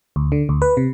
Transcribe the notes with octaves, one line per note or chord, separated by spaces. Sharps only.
D2
D3
D2
B4
C3